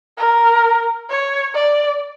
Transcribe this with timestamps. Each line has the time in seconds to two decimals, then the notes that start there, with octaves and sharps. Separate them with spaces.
0.18 A#4
1.09 C#5
1.55 D5